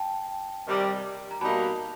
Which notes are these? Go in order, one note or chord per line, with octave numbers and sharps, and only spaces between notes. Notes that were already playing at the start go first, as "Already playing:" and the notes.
Already playing: G5 A5
C3 D#3 G3
A#5
B2 G3 A#3 D#4 A5 B5